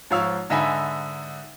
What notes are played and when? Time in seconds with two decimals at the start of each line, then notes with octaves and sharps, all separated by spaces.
0.10 G#2 F3 C#5 F5 E6
0.50 G#2 D3 D#4 E5 G#5 B5